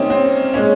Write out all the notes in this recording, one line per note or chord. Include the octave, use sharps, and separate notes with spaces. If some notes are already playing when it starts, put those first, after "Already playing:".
Already playing: C3 G3 A#3 C4 C#4 D#4
C4
A#2 G#3 C#4